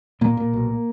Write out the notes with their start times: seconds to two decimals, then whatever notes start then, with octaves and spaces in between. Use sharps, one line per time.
0.21 A#2 A#3
0.37 A#2
0.53 B1